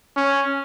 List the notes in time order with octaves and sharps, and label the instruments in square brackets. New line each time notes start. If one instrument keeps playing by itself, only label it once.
[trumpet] C#4